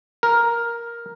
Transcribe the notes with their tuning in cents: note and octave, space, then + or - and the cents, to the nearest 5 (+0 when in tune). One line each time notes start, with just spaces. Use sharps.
A#4 +5